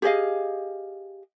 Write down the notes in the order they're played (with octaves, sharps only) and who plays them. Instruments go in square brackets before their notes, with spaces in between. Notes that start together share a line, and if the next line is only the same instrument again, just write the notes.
[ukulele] G4 G#4 D#5 F5